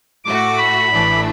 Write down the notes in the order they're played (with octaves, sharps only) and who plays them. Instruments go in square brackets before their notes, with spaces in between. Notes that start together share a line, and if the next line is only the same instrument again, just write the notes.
[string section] A2 A3 F#4 [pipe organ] D6
[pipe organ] B5
[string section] A1 A2 E3 A3 D4